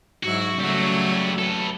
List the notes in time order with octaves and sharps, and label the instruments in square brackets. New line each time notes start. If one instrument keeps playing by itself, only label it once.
[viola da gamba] G#2 F#3 E4 [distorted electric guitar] F#4
[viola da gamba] C#3 F#3 A3 [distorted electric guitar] G3 F#4
[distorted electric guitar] A4 B4